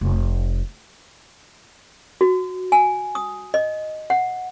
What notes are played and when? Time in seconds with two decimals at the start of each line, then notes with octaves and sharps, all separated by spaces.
0.01 F1
2.21 F#4
2.72 G#5
3.15 D#6
3.54 D#5
4.10 F#5